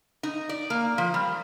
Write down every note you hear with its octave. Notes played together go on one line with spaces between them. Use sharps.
D#4
D5
A#3
F3
G3